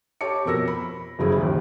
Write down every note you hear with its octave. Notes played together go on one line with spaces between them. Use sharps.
G4 C#5 A5 D6 C#7
F2 B2 A#4 E6 A#6
B5
F#1 F#2 C#3 G3 E4 G#4
A#1 D#2